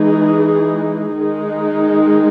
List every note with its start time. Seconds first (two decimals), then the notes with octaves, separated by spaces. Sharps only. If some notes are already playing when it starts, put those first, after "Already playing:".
Already playing: E3 G#3 D#4 G#4
1.19 D#3 G#3 D#4